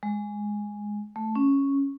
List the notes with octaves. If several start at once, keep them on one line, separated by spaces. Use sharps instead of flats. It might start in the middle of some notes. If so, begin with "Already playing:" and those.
G#3
A3
C#4